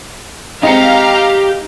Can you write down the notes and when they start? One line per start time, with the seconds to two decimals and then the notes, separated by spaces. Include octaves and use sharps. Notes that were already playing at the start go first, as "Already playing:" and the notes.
0.63 G#3 C4 D#4 G4 F5 A#5 C#7